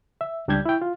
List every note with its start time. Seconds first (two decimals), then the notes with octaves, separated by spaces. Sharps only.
0.21 E5
0.48 C#2 G3 D4 G4 G6 G#6
0.65 E4 G5
0.82 F4